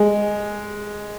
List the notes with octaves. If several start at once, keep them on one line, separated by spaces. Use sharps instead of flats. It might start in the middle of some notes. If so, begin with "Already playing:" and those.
Already playing: G#3